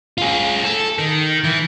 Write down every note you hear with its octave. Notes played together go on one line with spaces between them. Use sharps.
F4 G#4
A4
D#3
E3